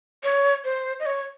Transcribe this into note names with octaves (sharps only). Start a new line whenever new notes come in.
C#5
C5
D#5
C#5